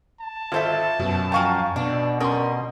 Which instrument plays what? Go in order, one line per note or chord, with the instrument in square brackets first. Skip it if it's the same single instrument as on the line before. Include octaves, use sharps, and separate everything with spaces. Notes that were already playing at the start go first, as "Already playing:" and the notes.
[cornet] A5
[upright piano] G#1 A4 [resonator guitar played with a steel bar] F4 C5 E5
[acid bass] F#2 [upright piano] B2
[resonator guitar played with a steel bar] F3 F5 A#5 [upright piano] G5 G#5 C#6
[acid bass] B2 [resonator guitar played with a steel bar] D4
[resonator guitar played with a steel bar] G3 C#4 A#4 [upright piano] C6 D#6